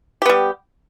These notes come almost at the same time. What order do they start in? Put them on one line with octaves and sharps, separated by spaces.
G4 B3 G3